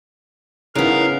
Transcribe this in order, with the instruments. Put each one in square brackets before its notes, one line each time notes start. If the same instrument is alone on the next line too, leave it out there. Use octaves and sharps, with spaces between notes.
[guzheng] C#3 B3 [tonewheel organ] D#4 E4 F#6 [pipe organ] A#4 F5 A#5